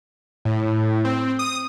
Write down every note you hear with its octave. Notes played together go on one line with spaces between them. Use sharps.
A2
C4
D#6